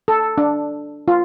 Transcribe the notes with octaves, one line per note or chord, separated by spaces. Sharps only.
A4
D4
F4